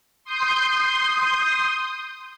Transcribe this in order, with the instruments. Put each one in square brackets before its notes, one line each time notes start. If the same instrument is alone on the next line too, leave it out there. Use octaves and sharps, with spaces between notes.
[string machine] C6 D#6 G6